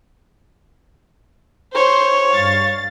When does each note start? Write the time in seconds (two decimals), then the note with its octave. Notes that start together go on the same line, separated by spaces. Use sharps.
1.75 C5 C#5
2.32 G2 F5 A6